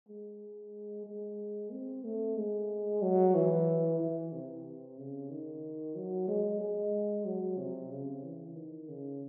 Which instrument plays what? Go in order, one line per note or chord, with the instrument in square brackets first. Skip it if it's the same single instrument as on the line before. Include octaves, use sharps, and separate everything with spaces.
[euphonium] G#3
G#3
C4
A3
G#3
F#3
E3
E3
C3
C#3
D#3
F#3
G#3
G#3
F#3
C3
C#3
E3
D#3
C#3